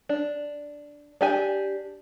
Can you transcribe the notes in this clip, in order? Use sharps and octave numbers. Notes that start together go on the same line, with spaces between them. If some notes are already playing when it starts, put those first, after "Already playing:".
D4
D4 G4 G#5